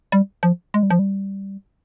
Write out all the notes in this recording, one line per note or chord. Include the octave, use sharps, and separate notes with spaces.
G3
F3
G#3
G3
F3
G3